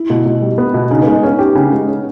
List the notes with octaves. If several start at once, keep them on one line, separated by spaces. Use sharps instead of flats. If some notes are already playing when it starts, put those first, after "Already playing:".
Already playing: E4
B2
B2
G3
B3
B2
C#3 D#4
B3
G#3
D#4
B3 C#4
G4
C#3
G#3
C#4